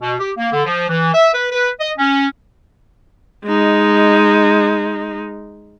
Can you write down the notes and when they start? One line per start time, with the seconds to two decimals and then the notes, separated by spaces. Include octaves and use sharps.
0.01 B2
0.19 G4
0.37 A#3
0.53 D3
0.66 F3
0.89 E3
1.14 E5
1.33 B4
1.52 B4
1.80 D#5
1.97 C#4
3.45 G#3 D#4